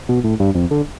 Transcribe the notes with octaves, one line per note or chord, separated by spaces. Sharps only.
B2
A2
G2
F2
D3